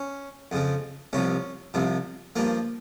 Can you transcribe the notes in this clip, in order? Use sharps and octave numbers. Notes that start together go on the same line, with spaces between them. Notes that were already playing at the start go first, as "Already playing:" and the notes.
Already playing: C#4
F2 C#3 F3
C2 C3 F3 C#4
C2 C3 F3
G2 F3 A#3